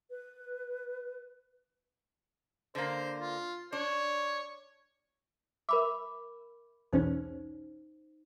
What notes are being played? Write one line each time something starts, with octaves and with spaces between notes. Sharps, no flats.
B4
D3 A#3 C5
F4
D4 C#5
A#4 E5 B5 D6
B1 E2 C#4 D#4 C5